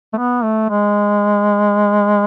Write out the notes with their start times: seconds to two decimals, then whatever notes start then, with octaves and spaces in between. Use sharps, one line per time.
0.13 A3
0.17 B3
0.43 A3
0.70 G#3